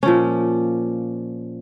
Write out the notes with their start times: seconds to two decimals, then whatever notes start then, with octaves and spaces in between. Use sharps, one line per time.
0.03 A#2 F3 C#4